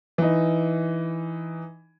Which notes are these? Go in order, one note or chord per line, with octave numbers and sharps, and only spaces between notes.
E3 D#4